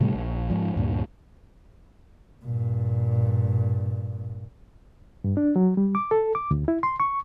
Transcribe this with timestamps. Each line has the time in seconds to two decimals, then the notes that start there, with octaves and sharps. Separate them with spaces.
0.01 A2 C3 G3 A3
0.15 A#1
0.50 G#2 F3
0.76 D2 G2 A#2
2.44 G2 A#2
5.24 G2
5.37 D4
5.56 F#3
5.77 G3
5.95 D6
6.11 A4
6.35 D6
6.51 D2
6.68 E4
6.83 C6
7.00 C#6